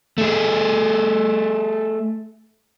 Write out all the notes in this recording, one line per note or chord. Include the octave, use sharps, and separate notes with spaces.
A3 G#4